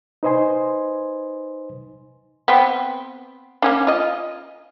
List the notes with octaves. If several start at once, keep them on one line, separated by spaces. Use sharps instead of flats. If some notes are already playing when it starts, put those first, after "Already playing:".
D#4 B4 C5 D#5 G#5 C6
B3 C4
A#3 C#4 D4
F4 D#5